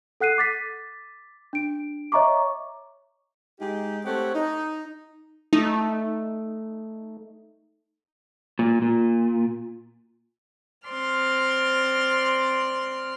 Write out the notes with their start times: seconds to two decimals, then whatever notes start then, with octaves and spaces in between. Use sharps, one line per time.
0.20 A4 F#5 F#6 C7 D#7
0.38 D6 A6 B6
1.53 D4 D7
2.12 C#5 D#5 E5 A#5 C#6 D6
3.60 G#3 D#4 G4
4.05 A3 C4 G4 C#5 F#5
4.35 D#4
5.53 A3 D#4
8.59 A#2
8.82 A#2
10.89 C4 D5 C6 F6